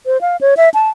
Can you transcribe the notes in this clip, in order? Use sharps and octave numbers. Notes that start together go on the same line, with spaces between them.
C5
F5
C#5
E5
A5